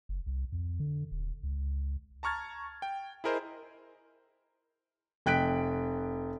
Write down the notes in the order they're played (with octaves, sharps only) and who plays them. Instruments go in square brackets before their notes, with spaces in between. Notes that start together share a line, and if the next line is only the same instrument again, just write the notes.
[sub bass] F#1
C2
F2
D3
D#1
C#2
[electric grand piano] A5 A#5 C#6 F6 G#6 A6
G5
E4 G#4 A#4 C5 D#5
[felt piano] F1 G5 F#6 B6 D7